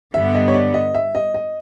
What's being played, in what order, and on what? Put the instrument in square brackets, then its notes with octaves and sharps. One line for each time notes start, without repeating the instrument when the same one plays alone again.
[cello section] G2 D3 G3 B3 [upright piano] E5
[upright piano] D#5
C#5
D5
D#5
E5
D#5
D#5